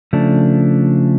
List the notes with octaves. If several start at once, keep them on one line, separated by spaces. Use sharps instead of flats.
C#3 F3 A3 D4